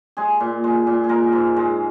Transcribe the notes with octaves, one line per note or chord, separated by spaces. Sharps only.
G#3 G#4
A#2
G#3
A#2
G#4
G#3 A#4
G#2
G#3